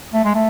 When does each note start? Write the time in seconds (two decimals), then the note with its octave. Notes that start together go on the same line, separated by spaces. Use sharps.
0.14 A3
0.25 G#3
0.35 A3